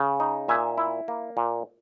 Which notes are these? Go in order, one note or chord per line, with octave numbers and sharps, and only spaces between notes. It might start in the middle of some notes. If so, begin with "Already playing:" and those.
Already playing: C#3
D#4
A#2 E5 G#5
E4
A#3
A#2